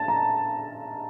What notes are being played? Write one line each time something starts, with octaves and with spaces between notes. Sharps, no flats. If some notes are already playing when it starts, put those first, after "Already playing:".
Already playing: A5
A#5